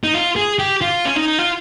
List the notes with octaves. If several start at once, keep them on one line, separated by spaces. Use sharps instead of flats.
D#4
F4
G#4
G4
F4
C#4
D#4
F4